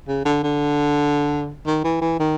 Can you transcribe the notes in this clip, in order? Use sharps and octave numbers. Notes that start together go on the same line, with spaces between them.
C#3
D3
D3
D#3
E3
E3
D#3